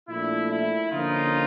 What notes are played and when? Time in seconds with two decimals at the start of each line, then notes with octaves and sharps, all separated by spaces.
0.09 A#2 F3 A3 D4 E4
0.51 E4
0.92 D3 F3 A#3 C#4 D#4 F4